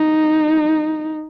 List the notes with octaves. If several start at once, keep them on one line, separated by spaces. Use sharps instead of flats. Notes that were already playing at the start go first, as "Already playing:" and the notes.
Already playing: D#4